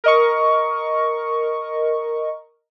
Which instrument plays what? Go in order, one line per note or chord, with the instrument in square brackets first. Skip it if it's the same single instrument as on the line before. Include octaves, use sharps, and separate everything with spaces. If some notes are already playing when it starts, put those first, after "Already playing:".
[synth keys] A#4 D#5 C#6